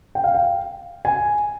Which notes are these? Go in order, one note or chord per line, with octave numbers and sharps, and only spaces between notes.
G5
F5
G5
G#5